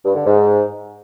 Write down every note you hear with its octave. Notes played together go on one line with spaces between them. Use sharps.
G2
D3
G#2